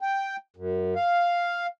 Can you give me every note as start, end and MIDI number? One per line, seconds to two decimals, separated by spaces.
0.01 0.36 79
0.56 0.94 42
0.96 1.67 77